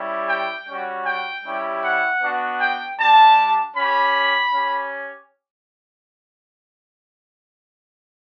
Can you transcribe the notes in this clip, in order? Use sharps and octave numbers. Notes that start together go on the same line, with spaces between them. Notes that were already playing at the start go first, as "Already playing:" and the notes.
Already playing: G3 C#4 E4 G4
G5
G3 C#4 F#4
G5
G3 C#4 E4 G4
F#5
B3 D4 F#4
G5
G3 D4 G4 A5
C#4 G4 B5
C#4 G4